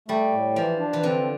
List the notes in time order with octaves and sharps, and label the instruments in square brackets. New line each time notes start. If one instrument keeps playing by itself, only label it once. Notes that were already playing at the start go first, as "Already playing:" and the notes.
[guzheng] G3 [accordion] A3
[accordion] A2
[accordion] E3 [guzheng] F3
[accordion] D4
[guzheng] E3
[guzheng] D3 [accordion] C4